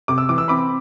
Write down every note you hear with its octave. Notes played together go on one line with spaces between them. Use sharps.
C3 D6
E6
E3 D6
E6
C4 B5 D6